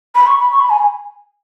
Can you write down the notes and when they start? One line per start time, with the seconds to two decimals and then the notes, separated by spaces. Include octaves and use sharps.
0.15 B5
0.27 C#6
0.39 B5
0.51 C#6
0.61 B5
0.70 G#5